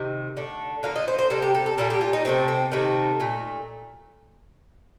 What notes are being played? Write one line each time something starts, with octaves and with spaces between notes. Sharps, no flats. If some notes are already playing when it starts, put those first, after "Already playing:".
Already playing: C3 D#3
D3 A3
D3 F3 A#3 F5
D#5
C5
C5
C3 G3 A#3 A4
G4
A4
A4
A#2 G3 A#3 A4
G4
F4
D#4
C3 D#3 A3 C4
C4
C3 D#3 A3 A#3
A#2 A3